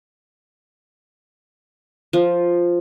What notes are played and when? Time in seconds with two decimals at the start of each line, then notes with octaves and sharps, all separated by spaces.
2.13 F3